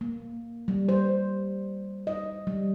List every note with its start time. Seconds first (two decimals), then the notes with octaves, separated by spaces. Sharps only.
0.01 A#3
0.68 G3
0.89 C5
2.07 D#5
2.47 G3